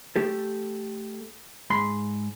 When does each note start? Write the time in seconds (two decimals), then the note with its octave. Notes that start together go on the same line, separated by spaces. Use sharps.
0.16 A3 G4 A4
1.70 G#2 B5 C6